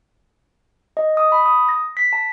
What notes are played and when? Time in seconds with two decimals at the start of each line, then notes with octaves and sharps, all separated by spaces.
0.97 D#5
1.17 D#6
1.32 B5
1.46 D#6
1.69 A#6
1.97 B6
2.13 A5